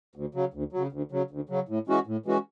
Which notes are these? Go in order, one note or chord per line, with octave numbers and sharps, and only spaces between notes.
D2
C#3 F#3
D2
C#3 F#3
D2
C#3 F#3
D2
C#3 F#3
A2
E3 G#3 C#4 F#4
A2
E3 G#3 C#4 F#4